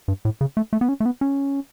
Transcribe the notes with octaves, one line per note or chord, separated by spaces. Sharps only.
G2
A2
C#3
A3
A3
B3
C#4
A3
B3
C#4